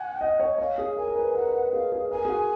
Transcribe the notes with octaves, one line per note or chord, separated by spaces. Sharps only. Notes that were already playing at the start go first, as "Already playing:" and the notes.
Already playing: F#5 G#5
D#5
C#5
C#5 F5
G#4
A#4 G#5
A#4
B4
A#4 F#5
B4
A#4
G#4 F5
G#4
A#4 G#5
G#4
F#4